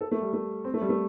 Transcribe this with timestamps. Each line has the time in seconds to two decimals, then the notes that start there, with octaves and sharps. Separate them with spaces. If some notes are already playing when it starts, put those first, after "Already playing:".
0.01 A4
0.11 A3
0.22 G3
0.33 A3
0.65 C4
0.74 A3
0.81 G3
0.89 A3